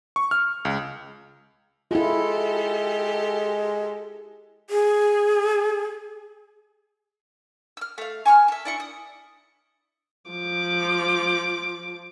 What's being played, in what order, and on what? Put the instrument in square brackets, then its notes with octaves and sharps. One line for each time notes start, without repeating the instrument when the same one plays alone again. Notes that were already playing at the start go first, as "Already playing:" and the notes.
[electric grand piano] C#6
F6
C#2
[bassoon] G#3 [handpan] E4 F4 [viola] G4 A4
[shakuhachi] G#4
[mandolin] E6 F6
A3 F5
G#5 C#6 E6 F6
A4 E5
D4 E4 C#6
D#6
[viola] F3 D6